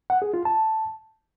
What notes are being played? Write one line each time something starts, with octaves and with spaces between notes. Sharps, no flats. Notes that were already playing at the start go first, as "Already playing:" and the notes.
F#5
G#4
F4
A5